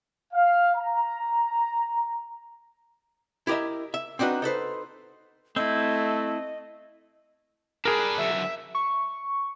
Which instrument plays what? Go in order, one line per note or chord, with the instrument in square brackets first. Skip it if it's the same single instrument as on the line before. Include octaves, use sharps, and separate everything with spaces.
[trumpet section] F5
A#5
[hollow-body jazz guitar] E4 G4 A#4 D#5 E5
E5
C4 D4 D#4 F#4 B4
D#4 A4 B4 C5
[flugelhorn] A3 [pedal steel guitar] C4 E4 [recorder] D#5
[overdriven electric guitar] D4 B4 [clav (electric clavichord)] G#4 A#4
[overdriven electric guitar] F#2 D3 [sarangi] E5
[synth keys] C#6